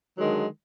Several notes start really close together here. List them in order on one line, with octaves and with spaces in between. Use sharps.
F#3 D#3 G#3 D3